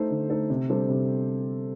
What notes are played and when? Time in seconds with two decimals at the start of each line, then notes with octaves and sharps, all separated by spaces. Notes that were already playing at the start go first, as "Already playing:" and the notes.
Already playing: A3 D#4 A4 C5
0.11 D3
0.30 A3 D#4 A4 C5
0.50 C3
0.69 G3 D4 A4 C5
0.89 C3